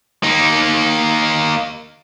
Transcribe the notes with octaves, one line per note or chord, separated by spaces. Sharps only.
A#3 D#4